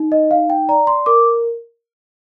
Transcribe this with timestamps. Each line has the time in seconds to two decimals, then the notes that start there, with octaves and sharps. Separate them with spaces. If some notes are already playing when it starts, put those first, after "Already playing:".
Already playing: D#4
0.12 D#5
0.31 D#4 F5
0.50 G5
0.69 D5 A#5
0.87 C6
1.06 A#4 D6